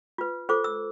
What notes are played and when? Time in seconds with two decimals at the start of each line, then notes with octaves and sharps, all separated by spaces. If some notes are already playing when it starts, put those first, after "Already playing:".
0.18 F4 B4
0.49 F4 A4 C5 D6
0.64 E6